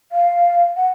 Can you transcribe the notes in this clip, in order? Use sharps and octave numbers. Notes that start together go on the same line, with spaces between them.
F5
F#5